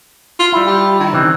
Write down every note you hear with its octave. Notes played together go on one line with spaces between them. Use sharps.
F4
G3 E4
G4
D#3
C#3 E3 C4